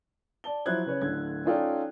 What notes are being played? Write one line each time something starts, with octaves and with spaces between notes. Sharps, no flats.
D5 A5 G7
F3 F#3 E4 C5 F#6 G#6
C#3 B4 C#5
D1 D3 G#6
C#4 D#4 F4 A4 D5 G5